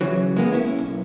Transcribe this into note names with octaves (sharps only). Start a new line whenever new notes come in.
C#3 E3 F#3
G#3 A#3 B3
C#4 E4
B1